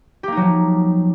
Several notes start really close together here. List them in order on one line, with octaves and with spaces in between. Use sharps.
G4 A#3 D#4 F#3 F3